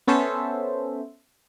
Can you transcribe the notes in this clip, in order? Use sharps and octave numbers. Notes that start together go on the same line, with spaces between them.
B3 C#4 A4 C5 E5